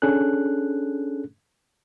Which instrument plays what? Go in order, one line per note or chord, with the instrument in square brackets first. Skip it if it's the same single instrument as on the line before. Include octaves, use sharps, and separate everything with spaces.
[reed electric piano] C#4 D4 G#4 A4 F#6